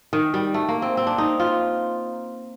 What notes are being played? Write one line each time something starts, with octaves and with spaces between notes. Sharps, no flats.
D#3
G3
A3
A#3
C4
C4
D4
D#4
F4